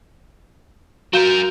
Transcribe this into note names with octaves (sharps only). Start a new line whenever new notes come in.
F#3 F#4 A#4 F5 G6